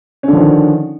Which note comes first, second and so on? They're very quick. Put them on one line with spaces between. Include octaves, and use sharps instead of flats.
C#4 D3 F3 D#3